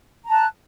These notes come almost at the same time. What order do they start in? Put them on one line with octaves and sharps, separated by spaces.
A#5 A5 F#6